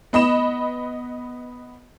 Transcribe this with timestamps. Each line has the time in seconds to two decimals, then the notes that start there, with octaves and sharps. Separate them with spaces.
0.13 B3 D#5 B5 E7